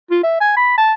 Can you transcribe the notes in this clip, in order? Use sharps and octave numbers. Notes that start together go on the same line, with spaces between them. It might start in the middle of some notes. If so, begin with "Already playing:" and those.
F4
E5
G#5
B5
A5